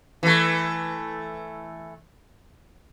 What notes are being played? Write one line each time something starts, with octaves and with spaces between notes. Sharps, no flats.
E3 A3